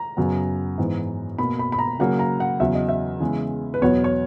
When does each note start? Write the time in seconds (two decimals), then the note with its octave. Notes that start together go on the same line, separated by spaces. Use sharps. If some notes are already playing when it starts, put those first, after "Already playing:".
Already playing: A#5
0.17 F#2 C#3 F#3 B3
0.78 G#2 E3 B3
1.39 B2 A#3 B5
1.59 B5
1.72 B5
1.79 A#5
1.99 C#3 F#3 A#3 F#5
2.19 A#5
2.40 F#5
2.60 E2 C#3 F#3 E5
2.75 D#5
2.89 E5
3.20 C#3 E3 G#3 B3
3.74 B4
3.82 E2 B2 F#3 B3 C#5
4.04 C#5